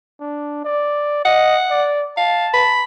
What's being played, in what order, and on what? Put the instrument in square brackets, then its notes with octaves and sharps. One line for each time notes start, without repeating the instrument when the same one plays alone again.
[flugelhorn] D4
D5
[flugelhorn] D#5 [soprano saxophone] F#5
[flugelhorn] D5
[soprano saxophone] F5 [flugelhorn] A5
[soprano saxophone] B5